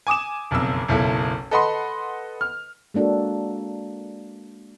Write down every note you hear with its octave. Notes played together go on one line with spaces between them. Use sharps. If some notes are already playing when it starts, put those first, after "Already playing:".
G#5 D6 D#6 E7
F#1 B1 F2 E6
F#1 B1 E4 A4
A4 B4 D#5 F#5 B5 C6
F6
G#3 A#3 D4 F#4 A4